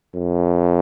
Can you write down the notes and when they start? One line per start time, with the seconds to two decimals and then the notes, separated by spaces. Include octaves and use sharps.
0.15 F2